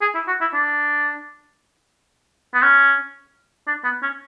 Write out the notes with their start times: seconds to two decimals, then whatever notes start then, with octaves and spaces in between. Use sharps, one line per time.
0.02 G#4
0.15 E4
0.28 F#4
0.41 E4
0.54 D4
2.54 B3
2.63 C#4
3.68 D4
3.84 B3
4.03 C#4